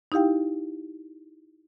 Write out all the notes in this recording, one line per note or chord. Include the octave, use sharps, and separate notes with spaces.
D#4 E4 G4 F5 G5